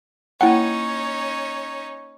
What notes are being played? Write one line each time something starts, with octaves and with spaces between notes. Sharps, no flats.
A#3 C#4 D#4 E4 C#5 F#5 G5